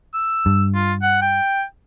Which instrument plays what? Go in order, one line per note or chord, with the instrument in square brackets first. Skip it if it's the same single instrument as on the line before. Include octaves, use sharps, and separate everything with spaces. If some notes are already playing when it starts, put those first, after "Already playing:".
[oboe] E6
[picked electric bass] G2
[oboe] F4
F#5
G5